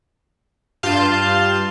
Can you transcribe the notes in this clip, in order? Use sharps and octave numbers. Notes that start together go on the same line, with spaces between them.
G2 F4 F5 A5 C6 G6